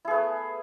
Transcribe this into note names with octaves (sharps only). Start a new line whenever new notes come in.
A3 B3 E4 G#4